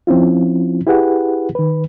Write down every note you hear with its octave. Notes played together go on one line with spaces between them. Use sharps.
F3 C4 C#4 E4 F4
E4 G4 G#4 B4 F#5
D#3 B4